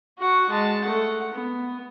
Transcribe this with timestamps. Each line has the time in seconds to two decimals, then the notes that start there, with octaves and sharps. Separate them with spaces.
0.19 F#4 F#5
0.50 G#3 A5
0.85 A3 F#5
1.34 B3